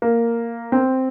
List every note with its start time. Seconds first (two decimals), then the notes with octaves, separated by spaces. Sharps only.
0.02 A#3
0.72 C4